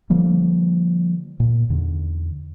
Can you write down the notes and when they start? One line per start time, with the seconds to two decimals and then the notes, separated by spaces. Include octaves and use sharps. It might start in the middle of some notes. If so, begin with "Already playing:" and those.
0.10 D3 F3 G3 A#3
1.40 A#2
1.69 E2 D3